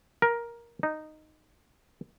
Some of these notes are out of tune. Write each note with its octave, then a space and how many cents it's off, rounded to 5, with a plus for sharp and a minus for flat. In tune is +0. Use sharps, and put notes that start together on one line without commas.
A#4 +10
D#4 -10